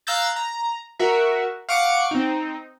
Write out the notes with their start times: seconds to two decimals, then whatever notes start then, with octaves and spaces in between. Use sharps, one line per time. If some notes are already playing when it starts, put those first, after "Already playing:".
0.07 F5 A#5 E6 F#6 G6 A6
0.36 A#5
0.99 F#4 A#4 E5
1.69 F5 F#5 C#6 D6 C#7 D7
2.11 C4 D#4